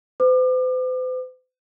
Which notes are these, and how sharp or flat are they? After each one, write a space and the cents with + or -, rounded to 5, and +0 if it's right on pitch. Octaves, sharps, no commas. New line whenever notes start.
C5 -45 D6 +35